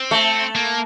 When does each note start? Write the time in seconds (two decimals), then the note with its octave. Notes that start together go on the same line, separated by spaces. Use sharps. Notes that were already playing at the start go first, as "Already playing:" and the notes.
Already playing: C4
0.11 A3
0.56 A#3